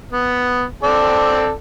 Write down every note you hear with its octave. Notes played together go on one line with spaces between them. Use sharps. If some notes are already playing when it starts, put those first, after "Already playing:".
B3
C4 A4 D5